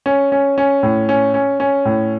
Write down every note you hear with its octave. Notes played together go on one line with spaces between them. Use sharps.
C#4
C#4
C#4
A2
C#4
C#4
C#4
A2